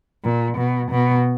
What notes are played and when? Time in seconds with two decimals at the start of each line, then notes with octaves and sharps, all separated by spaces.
0.24 A#2
0.57 B2
0.91 B2